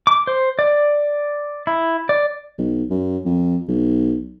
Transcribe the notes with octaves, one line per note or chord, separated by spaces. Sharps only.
D6
C5
D5
E4
D5
B1
F#2
F2
B1